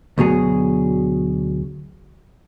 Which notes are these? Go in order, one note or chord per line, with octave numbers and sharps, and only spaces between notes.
D2 B2 F#3 G#4